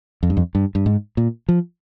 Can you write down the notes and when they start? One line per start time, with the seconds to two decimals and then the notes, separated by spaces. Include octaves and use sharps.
0.23 F2
0.30 G2
0.37 F2
0.55 G2
0.75 G2
0.86 G#2
1.17 A#2
1.49 F3